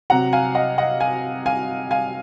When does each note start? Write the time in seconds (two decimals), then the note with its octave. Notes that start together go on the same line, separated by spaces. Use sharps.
0.10 C3 F#3 F#5 A#5
0.33 F5 G#5
0.55 D#5 F#5
0.78 D#5 F#5
1.00 F5 G#5
1.46 F5 G#5
1.91 F5 G#5